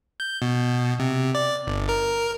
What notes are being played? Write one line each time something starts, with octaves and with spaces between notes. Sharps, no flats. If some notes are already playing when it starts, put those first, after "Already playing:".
G6
B2
C3
D5
G1
A#4